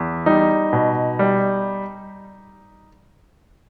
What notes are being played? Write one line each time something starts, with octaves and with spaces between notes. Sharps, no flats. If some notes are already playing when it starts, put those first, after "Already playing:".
Already playing: E2
G3 D#4
B2
G3